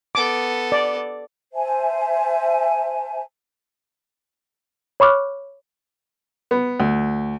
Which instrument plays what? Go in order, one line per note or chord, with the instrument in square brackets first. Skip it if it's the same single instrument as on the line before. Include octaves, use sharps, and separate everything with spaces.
[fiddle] B3 A4 [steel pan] D6
[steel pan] D5
[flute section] C5 E5 G#5 A5
[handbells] C#5 B5 C#6 D6 F6 F#6
[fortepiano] B3
D2